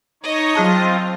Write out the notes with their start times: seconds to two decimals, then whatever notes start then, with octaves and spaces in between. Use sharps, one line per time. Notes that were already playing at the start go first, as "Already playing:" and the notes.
0.23 D#4 C#5 D#5
0.55 F#3 C4 F4 G#4 A5